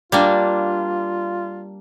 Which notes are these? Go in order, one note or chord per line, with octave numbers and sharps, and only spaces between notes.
G3 A#3 D4 F4